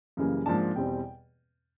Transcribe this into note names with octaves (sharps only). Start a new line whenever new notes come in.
F#2 C#3 E3 G3 A#3
G#2 F3 A#3 D4 A5
E2 B2 G3 C4 G5